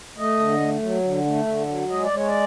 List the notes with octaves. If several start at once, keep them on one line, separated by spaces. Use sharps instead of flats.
A3 D#5
D3
A3
F#3
D3
A3
D3
F#3
G#3 D#5
D5
G#3 C#5
D5